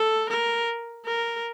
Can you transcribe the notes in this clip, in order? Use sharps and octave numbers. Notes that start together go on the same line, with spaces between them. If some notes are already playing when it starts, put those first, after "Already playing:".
Already playing: A4
A#4
A#4